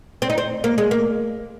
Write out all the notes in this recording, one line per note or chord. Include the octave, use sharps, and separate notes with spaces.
C4
D#4
C4
A#3
G#3
A#3